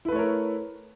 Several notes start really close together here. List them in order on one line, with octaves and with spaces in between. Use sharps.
E4 B4 A3 C#5 A#4